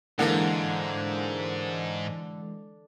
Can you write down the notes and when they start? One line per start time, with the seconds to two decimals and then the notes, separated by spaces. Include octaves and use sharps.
0.19 G#2 D3 E3 G#3 A#3 F#5